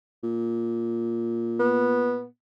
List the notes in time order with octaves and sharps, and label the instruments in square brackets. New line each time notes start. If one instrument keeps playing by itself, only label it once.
[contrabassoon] A#2
[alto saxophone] B3